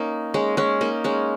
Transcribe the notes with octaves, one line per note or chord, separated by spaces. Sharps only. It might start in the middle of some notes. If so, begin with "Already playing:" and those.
Already playing: A#3 C#4 D#4
G#3 C#4
G#3 C#4
A#3 D#4
G#3 C#4